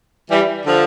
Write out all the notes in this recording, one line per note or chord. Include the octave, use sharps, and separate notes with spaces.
E3 G3
D3 F3